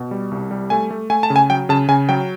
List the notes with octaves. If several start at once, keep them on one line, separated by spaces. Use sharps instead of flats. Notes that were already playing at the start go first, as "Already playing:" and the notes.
Already playing: B2
G3
C2
G3
A3 G#5
A3
A3 G#5
A5
C#3
G#5
F#3 G5
C#3 A5
C#3 G#5
F#3 G5